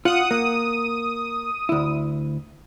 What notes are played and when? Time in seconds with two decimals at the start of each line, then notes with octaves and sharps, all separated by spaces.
0.05 F4 F#5 D#6
0.31 A#3 D#6
1.69 D2 E4